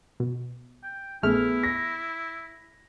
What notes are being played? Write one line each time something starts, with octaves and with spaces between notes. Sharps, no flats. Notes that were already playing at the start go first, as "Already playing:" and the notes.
B2
G5
A#1 A3 B3 E4 G#4 F6
A#6